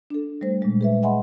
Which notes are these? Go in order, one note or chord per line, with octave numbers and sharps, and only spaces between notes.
D4 A4
G3 A3 C5
A#2 G#3
G#4 B4 E5
D#5 E5 F#5 G#5 B5 C6